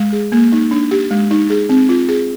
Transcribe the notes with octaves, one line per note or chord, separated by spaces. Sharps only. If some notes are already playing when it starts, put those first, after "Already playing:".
Already playing: G#3
G#4
A#3
D#4
D4
G4
G#3
D#4
G#4
C4
F4
G#4